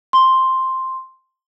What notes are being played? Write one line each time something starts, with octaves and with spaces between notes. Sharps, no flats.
C6